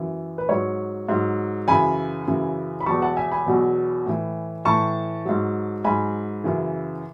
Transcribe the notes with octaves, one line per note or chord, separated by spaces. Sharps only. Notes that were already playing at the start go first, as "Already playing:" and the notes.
Already playing: F#2 E3
B4
G#2 F#3 C#5
G#2 F#3
F#2 C#3 E3 G#5 B5
F#2 C#3 E3
B5
E2 B2 F#3 A5 C#6
F#5 A5
E5 G#5
G#5 B5
E2 B2 F#3
A2 E3
A2 E3 A5 C#6
G#2 F#3
G#2 F#3 G#5 B5
F#2 C#3 E3